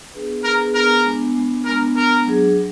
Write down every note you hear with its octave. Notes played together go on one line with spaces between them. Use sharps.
B3 D4 G#4 B4
B3 D4 G#4 A#4 B4
B3 D4 G#4 A#4 B4
G#3 B3 D4
G#3 B3 D4
G#3 B3 D4 A#4
G#3 B3 D4 A#4
F#3 D4 G#4
F#3